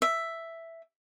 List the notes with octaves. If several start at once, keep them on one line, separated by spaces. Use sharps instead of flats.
E5